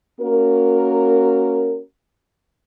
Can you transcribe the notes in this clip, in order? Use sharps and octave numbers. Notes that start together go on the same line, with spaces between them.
A#3 C#4 F#4 A#4